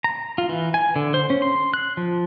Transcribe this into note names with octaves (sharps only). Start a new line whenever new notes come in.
A#5
F4
E3
G#5
D3
C5
C#4
C6
F#6
F3